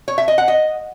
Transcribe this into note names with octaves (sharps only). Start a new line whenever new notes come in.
C#5
E5
D#5
F#5
D#5